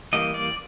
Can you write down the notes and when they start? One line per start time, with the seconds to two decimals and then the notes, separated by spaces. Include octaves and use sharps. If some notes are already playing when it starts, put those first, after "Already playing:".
0.13 E3 G3 A#3 D#5
0.34 D5